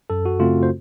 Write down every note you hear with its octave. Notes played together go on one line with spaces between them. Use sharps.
F#2 A4
F#4
C#3 A3 C4 F4
C5